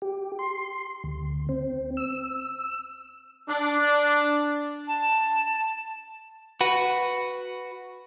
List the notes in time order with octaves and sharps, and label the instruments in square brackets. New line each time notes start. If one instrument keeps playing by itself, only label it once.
[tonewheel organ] G4
C6
D2
C4
E6
[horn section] D4
[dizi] A5
[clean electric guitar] F#4 B4